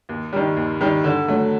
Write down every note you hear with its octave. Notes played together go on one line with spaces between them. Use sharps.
D#2
D#3 G3
D#2
D#3 G3
D3
F#3 A3